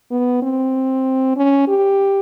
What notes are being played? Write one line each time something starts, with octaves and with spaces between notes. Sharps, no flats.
B3
C4
C#4
G4